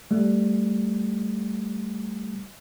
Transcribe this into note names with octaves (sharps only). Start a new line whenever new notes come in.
G3 A3